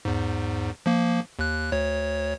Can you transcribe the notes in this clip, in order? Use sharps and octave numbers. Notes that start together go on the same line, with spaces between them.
E2 G#2
F3 A#3
D#2 F#6
D2 C#5